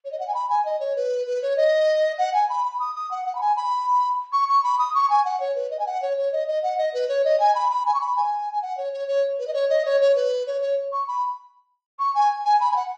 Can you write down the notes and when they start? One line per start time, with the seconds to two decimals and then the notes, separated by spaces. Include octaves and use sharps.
0.05 C#5
0.12 D#5
0.19 F#5
0.27 G#5
0.34 B5
0.50 G#5
0.65 D#5
0.80 C#5
0.96 B4
1.27 B4
1.42 C#5
1.57 D#5
2.18 F#5
2.34 G#5
2.49 B5
2.65 B5
2.80 D#6
2.95 D#6
3.11 F#5
3.26 F#5
3.35 B5
3.41 G#5
3.56 B5
4.32 C#6
4.48 C#6
4.63 B5
4.79 D#6
4.94 C#6
5.10 G#5
5.25 F#5
5.40 C#5
5.55 B4
5.71 D#5
5.79 G#5
5.86 F#5
6.02 C#5
6.17 C#5
6.32 D#5
6.48 D#5
6.63 F#5
6.78 D#5
6.94 B4
7.08 C#5
7.24 D#5
7.40 G#5
7.55 B5
7.70 B5
7.86 G#5
7.94 C#6
8.01 B5
8.16 G#5
8.53 G#5
8.62 F#5
8.77 C#5
8.93 C#5
9.08 C#5
9.39 B4
9.47 D#5
9.53 C#5
9.69 D#5
9.85 C#5
10.01 C#5
10.15 B4
10.47 C#5
10.61 C#5
10.92 C#6
11.08 B5
11.99 C#6
12.15 G#5
12.45 G#5
12.60 B5
12.71 G#5
12.76 F#5